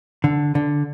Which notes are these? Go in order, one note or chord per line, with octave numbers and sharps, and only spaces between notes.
D3
D3